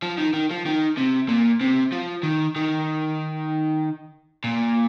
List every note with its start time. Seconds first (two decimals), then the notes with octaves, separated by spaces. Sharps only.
0.03 F3
0.18 D#3
0.34 D#3
0.51 F3
0.66 D#3
0.98 C3
1.29 A#2
1.61 C3
1.92 F3
2.23 D#3
2.56 D#3
4.44 A#2